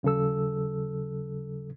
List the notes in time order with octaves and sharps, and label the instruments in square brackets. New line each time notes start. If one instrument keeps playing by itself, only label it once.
[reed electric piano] D#2 C#3 F#3 A4 E6